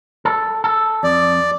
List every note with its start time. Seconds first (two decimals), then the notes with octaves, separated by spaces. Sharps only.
0.25 A4
0.64 A4
1.03 F2 D5